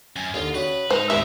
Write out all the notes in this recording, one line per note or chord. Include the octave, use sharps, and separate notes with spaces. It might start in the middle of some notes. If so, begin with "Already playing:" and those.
F#2 G#5
D#2 D3 F4
C#3 F#4 B4
G#2 D#4 C5
D#2 A2 C3 B3 E5